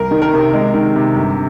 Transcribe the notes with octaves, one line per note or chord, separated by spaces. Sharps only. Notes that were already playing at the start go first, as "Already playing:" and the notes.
Already playing: C2 A#4
D#3
A#4
C3
G#3
D#3
C3
G1